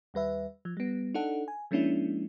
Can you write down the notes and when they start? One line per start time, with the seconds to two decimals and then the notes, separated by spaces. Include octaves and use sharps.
0.14 D#2 G3 B4 E5
0.65 F3
0.77 G3 B3
1.14 D4 D#4 A4 F#5
1.48 G#5
1.71 F3 G#3 A#3 C#4 D4 E4